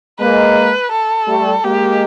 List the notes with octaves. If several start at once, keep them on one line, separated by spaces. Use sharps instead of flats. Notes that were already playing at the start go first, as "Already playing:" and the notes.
G#3 A#3 B4
A4
G3 A3
G#3 A#3 G4